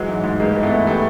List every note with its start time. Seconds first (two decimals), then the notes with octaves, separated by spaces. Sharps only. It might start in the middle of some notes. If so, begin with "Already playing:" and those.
Already playing: E3 F#3 G#3
0.08 G#2
0.23 G#2
0.40 G2 G#3 A#3
0.56 E3
0.63 A3 B3
0.72 E3
0.87 G3 A3